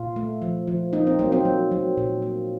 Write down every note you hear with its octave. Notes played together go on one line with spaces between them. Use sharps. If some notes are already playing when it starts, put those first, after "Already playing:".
Already playing: A#2 F4
A3
F3
F3
A#3 D#4
C4
F#3 A#3
C4
F#3
F#3
A#2
A#3